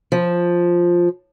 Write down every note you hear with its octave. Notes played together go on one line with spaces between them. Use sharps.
F3